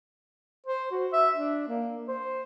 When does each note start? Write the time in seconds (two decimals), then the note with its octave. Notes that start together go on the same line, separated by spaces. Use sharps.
0.66 C5
0.91 F#4
1.13 E5
1.36 D4
1.68 A#3
2.08 C5